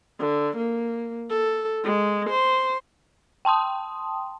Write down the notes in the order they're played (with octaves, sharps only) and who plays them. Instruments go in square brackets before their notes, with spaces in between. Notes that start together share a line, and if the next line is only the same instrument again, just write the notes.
[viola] D3
A#3
A4
G#3
C5
[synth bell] G5 A5 C6 D#6